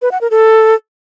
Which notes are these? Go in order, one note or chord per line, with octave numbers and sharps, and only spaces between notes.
B4
F#5
A#4
A4